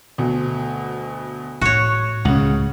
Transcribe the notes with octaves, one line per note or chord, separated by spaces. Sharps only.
D2 B2
A2 F#4 C#5
C#2 C#3 F#5